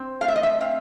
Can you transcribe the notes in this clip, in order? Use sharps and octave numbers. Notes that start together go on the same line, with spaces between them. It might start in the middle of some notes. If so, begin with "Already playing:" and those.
Already playing: C4
A3 F5
E5
D#5
E5
C4 F5